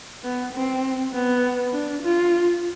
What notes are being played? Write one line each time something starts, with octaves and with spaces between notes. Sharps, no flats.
B3
C4
B3
D4
F4